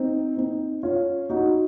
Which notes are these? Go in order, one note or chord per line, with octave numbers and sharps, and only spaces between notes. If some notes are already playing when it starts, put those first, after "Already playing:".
Already playing: C4 D#4
C4 D#4
C#4 F4
D#4 F#4